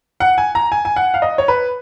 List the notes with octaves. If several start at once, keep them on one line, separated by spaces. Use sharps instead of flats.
F#5
G#5
A#5
G#5
G#5
F#5
F5
D#5
C#5
B4